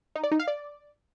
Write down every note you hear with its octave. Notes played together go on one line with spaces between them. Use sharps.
D#4
D5
D#4
F5
D5